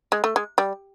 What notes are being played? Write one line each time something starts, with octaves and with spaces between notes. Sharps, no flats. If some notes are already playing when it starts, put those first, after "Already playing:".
G#3
A3
G#3
G3